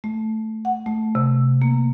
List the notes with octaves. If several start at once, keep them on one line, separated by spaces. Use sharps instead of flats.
A3
F#5
A3
C3
A#3